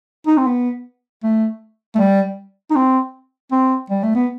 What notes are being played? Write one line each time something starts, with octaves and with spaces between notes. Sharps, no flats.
D#4
C4
B3
A3
A3
G3
D#4
C4
C4
G3
A3
B3